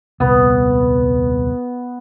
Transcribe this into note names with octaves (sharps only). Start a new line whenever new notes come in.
D#1 C2 B3